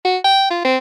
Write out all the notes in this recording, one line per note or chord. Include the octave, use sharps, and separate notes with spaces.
F#4
G5
F4
C4